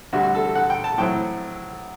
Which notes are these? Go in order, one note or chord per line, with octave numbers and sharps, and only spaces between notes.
D2 C3 G3 F#4
F#4
A4
A4
F#5
G5
A5
A2 F#3 C4 E4 G5